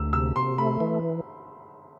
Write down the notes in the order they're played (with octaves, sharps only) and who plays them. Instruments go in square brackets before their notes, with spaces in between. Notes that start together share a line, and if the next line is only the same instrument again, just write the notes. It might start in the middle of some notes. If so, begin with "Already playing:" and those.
Already playing: [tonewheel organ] D2 [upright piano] E6
[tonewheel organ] C3 [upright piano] E6
[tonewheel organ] C3 [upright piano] C6
[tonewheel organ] A3 [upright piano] B5
[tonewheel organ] E3